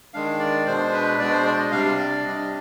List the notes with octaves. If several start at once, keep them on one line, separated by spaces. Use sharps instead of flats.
D#3 G#3 D4 F5
D5
B2 G#3 D4 C5
B4
B2 G#3 D4 D5
C5
D5
D#5
C3 G3 D4 F5
D5
C3 G3 D4 D#5